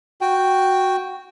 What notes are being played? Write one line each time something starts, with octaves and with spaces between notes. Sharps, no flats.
F#4 G5